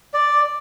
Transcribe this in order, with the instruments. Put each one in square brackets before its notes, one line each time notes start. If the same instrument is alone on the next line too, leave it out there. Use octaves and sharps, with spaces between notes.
[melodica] D5